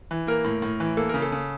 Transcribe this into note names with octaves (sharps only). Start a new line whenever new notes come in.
E3
A#3 A#4
A2
A2
E3
A#3 A4
C#3 A#4
A4
C#3